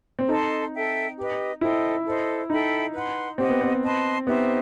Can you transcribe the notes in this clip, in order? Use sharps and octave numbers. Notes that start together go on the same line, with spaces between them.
C4
D#4 A4 D#5 A5 C6
A4 E5 G5
G4 B4 D#5
E4 A4 C5 D#5 G5
A4 C5 D#5
D#4 A4 E5 G5 B5
B4 F#5 C6
C4 G4 D#5 F#5
B3
C4
B4 D#5 A5 C6
B3 D#4 G4 C5 E5